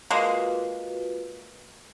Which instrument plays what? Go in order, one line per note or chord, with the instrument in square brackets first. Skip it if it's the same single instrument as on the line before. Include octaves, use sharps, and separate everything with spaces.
[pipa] G#3 A#3 [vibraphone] F4 F#4 B4